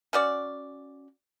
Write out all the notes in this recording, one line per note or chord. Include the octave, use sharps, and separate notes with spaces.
C#4 F#4 D5